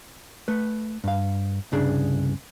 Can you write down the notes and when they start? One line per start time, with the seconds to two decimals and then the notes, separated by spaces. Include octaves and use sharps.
0.48 A3 B4
1.04 G2 F5
1.72 C2 G2 C#3 D4 G#4